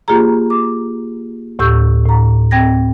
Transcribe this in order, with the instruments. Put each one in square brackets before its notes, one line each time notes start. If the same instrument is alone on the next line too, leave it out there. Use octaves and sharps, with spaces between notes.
[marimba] A#3 F4 G4 G#4 A#5
D6
D2 A2 G4 C#6 E6 G6
A2 A#5
C4 G5 G#6 A#6